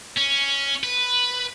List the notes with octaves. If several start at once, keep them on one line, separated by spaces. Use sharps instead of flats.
C#4
B4